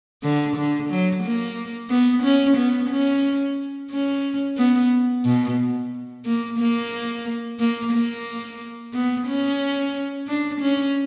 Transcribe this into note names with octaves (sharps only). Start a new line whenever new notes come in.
D3
D3
F#3
A#3
B3
C#4
B3
C#4
C#4
B3
B2
A#3
A#3
A#3
A#3
B3
C#4
D4
C#4